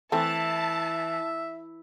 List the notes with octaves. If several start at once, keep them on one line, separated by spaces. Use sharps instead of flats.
E3 A3 C4 A4 E5 A5